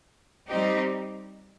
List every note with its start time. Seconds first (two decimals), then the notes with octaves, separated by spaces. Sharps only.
0.48 G3 C4 D#4 G4